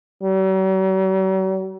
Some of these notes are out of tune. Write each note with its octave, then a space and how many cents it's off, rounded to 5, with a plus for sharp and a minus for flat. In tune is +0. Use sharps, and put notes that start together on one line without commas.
F#3 +45